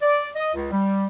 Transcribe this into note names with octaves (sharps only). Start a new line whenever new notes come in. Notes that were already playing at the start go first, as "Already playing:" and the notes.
D5
D#5
C#2
G3